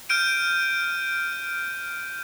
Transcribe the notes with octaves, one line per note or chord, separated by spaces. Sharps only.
F6 G6 D7 D#7